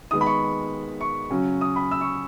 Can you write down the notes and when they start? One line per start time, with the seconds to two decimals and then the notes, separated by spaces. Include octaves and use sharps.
0.11 D#3 G#3 B3 D#6
0.21 B5
0.26 C#6
1.01 C#6
1.31 C#3 F#3 C#4
1.61 D#6
1.76 B5
1.91 E6
2.01 C#6